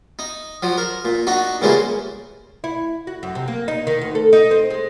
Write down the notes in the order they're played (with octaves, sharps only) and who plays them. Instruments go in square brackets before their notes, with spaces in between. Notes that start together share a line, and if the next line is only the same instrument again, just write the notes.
[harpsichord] D#4
F3 F#3
A#4
A#2
D4 D#4 F#4
A#2 C#3 E3 G3 G#3 A#3
[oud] E4
F#4
F#2
C3
A#3
D#4
D#3
D2
A4
D#4
C4
G#3